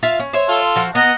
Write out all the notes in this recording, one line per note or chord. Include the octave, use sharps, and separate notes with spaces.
F4 E5 F5
C#4
C5 C#5 E5
F4 A4
F3 F#4
B3 D#5 F#5 A#5